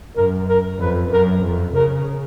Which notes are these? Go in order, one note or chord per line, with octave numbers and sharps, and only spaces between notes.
F#2 A#4
A#4
F2 B4
F#2 A#4
F2
C#3 A#4